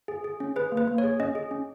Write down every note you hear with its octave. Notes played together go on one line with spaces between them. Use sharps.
G#4
G#4
C#4
G#4 B4
A#3
B4
A#3
C#5
G#4
C#4 D#5
G#4
C#4